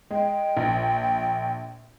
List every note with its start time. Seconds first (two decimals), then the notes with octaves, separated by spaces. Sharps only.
0.11 G#3 G5
0.57 A#1